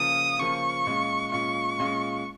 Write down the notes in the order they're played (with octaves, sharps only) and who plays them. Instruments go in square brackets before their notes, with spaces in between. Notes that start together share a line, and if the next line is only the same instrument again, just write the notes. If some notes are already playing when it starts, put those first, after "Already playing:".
Already playing: [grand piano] C#3 F3 A#3 F4 [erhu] D#6
[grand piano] C#3 F3 A#3 F4 [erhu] C#6
[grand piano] A#2 G#3 C#4 F4
[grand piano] A#2 G#3 C#4 F4 [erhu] C#6
[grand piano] A#2 G#3 C#4 F4